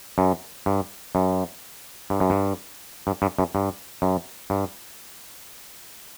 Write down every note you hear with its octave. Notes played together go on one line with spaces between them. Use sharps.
F#2
G2
F#2
G2
F#2
G2
G2
G2
F#2
G2
F#2
G2